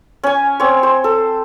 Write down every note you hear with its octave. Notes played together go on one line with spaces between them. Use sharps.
C#4 G#5
C4 C#5
C5
A4